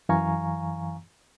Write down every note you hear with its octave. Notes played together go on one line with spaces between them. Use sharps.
F#2 E3 F5 G#5 A#5 C#6